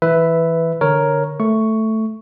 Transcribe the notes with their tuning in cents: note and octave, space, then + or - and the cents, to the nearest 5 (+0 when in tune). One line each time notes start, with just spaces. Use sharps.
E3 -10 B4 +10 E5 +0
D3 +0 A#4 +5 C#5 +0
A3 +0 C#6 +5